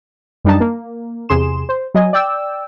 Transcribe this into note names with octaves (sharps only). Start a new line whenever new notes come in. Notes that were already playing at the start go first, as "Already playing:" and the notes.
F#2 G3 D4 D#4 A5
A#3
E2 C3 G#4 C6 E7
C5
F#3 D#5 G#5
D5 G5 E6